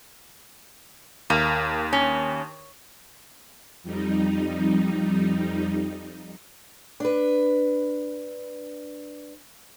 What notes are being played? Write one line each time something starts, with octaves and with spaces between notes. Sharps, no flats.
D#2 A#3
C#4
F2 G3 D#4
D4 B4